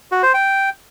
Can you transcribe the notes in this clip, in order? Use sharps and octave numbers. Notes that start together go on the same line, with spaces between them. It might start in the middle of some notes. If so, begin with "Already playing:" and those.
F#4
C5
G5